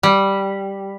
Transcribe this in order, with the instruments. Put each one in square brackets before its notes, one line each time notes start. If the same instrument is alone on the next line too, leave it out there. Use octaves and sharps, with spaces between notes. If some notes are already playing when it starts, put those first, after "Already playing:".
[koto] G3